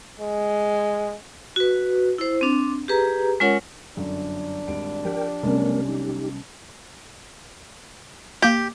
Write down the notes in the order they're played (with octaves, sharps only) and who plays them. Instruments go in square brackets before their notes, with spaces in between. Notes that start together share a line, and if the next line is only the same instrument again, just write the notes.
[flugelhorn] G#3
[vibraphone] F#4 B4
E4 C5
C4 D4
G4 G#4 B4 A#5
G#3 C#4 F4 A#4 C#5 F#5
[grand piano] G1 F#2 D3 [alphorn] D4
[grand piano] G#1 G3 D7
[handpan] F3 [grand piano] G4 D5 [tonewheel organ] A#4 G5
[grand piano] B1 [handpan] C3 G3 C#4 [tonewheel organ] A3 B3 A#4
[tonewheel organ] D#4 G4
[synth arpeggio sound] A#3 G6 [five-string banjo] G4